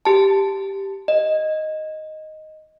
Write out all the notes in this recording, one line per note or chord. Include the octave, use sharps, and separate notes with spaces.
G4 A5
D#5